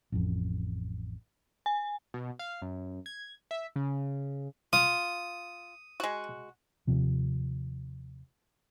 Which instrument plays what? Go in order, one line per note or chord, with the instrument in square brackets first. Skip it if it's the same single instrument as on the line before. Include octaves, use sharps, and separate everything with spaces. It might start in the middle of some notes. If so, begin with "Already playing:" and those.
[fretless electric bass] A1 F2
[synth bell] G#5
[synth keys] B2
F5
F#2
G#6
E5
C#3
[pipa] F4 [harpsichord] D#6
[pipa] G#3 F#4
[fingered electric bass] D#2 C3 F3